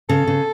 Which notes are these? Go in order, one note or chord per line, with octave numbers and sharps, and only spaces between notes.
C#3 A4
C#3